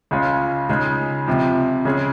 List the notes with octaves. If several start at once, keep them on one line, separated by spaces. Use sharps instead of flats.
C#2 C#3 G#3 C#4 F4
C#2 C#3 G#3 D#4
C#2 C3 F3
C#2 C#3 G#3 C#4 G#4